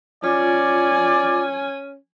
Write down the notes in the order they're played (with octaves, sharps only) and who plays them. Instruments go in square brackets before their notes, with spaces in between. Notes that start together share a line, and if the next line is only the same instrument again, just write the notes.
[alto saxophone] C#4 [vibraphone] F4 [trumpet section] D5 [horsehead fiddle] G#5